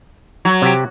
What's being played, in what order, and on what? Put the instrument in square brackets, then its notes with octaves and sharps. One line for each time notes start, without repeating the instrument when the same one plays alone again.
[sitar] F#3
[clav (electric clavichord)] C3 G4